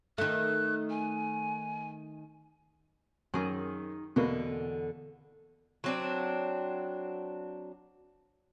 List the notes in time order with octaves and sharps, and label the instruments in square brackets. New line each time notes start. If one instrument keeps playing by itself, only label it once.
[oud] D#3 A3 [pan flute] F#6
[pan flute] G#5
[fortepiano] F#2 [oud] D#3 G#4
[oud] E2 D3 [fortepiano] B2 A#3
[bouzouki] F#3 C4 D4